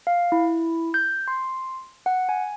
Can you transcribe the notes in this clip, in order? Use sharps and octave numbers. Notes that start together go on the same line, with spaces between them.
F5
E4
G6
C6
F#5
G#5